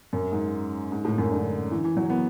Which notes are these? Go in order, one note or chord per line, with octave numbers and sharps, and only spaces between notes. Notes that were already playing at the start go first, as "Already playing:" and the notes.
F#2
G#2
G#2
A2
F#2
D3
E3
E3
F#3
B3